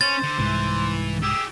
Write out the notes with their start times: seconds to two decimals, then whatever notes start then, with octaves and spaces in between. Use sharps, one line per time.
0.01 C#4 C5 A6
0.23 D3
0.38 C2 G#2 E3
1.23 G4 G#4 E6